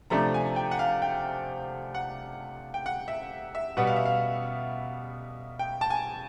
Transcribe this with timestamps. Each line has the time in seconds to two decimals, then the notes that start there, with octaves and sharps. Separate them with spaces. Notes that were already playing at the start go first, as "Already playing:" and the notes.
0.10 C3 F3 A3 D4 A#5
0.34 G#5
0.56 G5
0.71 F#5
0.79 F5
1.02 G5
1.95 F#5
2.74 G5
2.86 F#5
3.08 E5
3.55 E5
3.77 B2 G3 B3 F#5
3.87 F5
3.96 E5
4.06 F5
5.59 G5
5.81 A5
5.90 G#5